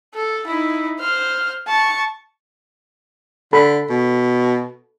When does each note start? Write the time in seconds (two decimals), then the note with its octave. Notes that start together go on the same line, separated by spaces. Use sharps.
0.14 A4
0.47 D#4 E4
1.00 C5 F6
1.68 A5 C#6
3.53 D3 A4 B5
3.89 B2